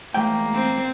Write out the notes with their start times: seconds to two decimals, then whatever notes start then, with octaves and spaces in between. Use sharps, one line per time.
0.14 E2 G#2 A3 A#3 G5
0.54 C4